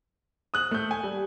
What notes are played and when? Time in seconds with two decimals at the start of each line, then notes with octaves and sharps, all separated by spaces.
0.54 D#6 F#6 F#7
0.71 A3 G6
0.91 G#5
1.04 G3